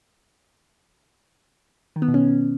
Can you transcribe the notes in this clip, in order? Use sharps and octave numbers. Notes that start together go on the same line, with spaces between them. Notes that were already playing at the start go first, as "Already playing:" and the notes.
D#3
B3
B2
C#4